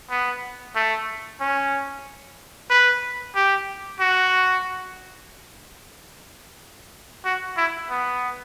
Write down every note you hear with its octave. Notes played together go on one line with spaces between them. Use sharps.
B3
A3
C#4
B4
G4
F#4
F#4
E4
B3